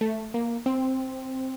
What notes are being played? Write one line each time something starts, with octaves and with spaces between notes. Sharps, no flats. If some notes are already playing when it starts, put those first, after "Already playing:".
A3
A#3
C4